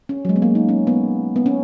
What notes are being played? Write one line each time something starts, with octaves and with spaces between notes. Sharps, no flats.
C#4
F#3
G#3
B3
A#3
D#4
C#4
B3
B3
C#4